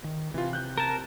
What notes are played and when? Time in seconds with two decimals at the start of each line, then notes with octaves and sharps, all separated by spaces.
0.04 D#3
0.34 C3 E3 F4
0.53 F#6 G6
0.78 A#4 A5